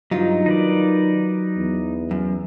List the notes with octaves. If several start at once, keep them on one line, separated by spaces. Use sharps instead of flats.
G2 F#3 D#4 F4
D#3 D#4 B4 D5
E2
F#2